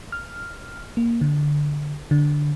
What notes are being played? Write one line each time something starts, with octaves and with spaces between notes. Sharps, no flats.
F6
A#3
D3
D3